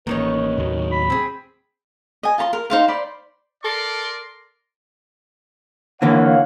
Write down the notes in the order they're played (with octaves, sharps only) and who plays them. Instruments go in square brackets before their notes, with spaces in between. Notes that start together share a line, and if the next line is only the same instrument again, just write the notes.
[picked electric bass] A1 A#3 [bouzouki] D#3 D#4 C#5 [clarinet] B4
[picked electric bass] D#2 A2 F#3
[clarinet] B5
[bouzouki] C4 G#4
[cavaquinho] D#5 G#5
F4 A5 A#5 C6
A#4
D#4 C5 F5
C5 D5 B5
[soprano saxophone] A4 [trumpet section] A#4 D5 C6
[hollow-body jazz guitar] D3 E3 A#3 [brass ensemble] C#5 F5 F#5